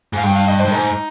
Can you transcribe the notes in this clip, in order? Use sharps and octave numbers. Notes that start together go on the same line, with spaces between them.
G#2 F5
G2 G5
F5
D#5
C5
G2
G#2 D#4